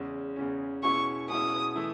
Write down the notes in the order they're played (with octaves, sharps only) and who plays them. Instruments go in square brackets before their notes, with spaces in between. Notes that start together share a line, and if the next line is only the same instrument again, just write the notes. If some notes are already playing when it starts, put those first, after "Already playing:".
Already playing: [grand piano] E2 C#3 G#3 C#4
E2 C#3 G#3 C#4
[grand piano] B2 G#3 C#4 E4 [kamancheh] C#6
[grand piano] B2 G#3 C#4 E4 [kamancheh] D#6
[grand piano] E3 A3 E4